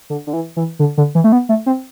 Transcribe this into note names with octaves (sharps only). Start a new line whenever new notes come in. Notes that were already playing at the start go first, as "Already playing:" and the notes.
D3
D3
E3
E3
D3
D3
E3
A3
B3
A3
C4